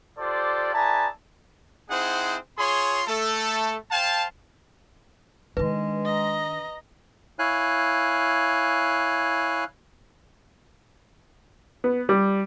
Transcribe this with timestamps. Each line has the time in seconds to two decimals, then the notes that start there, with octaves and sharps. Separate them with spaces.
0.19 F4 G4 A4 C5 D5
0.73 E4 G#4 B4 D5 A5 A#5
1.90 C4 D#4 E4 G#4 C5 F#5
2.58 F4 G#4 C#5 C6
3.07 A3 A4
3.91 C5 F5 G5 A5
5.57 D#3 G#3 D4 B4
6.05 D#5 A#5
7.39 E4 C#5 F5 G#5 F#6
11.84 B3
12.09 G3